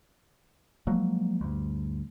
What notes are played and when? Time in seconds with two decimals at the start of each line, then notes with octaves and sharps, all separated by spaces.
0.87 F3 F#3 G#3 A#3
1.41 D2 G2